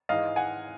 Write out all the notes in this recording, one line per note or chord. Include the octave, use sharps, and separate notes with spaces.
G#2 E3 G#3 D#5 F5
F#5 G#5